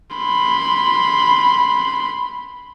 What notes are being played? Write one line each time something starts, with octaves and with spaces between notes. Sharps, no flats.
B5 C6